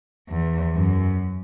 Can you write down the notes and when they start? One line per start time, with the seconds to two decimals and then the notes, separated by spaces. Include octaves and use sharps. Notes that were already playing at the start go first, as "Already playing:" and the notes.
0.29 E2
0.75 F#2